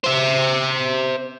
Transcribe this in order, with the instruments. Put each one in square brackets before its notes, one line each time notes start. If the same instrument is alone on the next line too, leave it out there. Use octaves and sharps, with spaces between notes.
[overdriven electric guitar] C5 E5